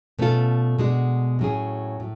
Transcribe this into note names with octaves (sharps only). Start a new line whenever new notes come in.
B2 A3 C#4 F4 A4
B2 G#3 D4 F#4
A2 F#3 C#4 G#4
A2